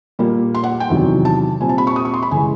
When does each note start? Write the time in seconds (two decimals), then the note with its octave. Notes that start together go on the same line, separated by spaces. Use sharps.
0.19 A#2 G3 A#3
0.55 C6
0.64 F#5
0.80 G5
0.90 E2 C3 D#3 F#3
1.25 A5
1.61 A#2 G3 C4 G#5
1.69 A5
1.78 B5
1.87 C#6
1.96 D#6
2.05 C#6
2.14 C6
2.22 B5
2.31 C#3 E3 G#3 G#5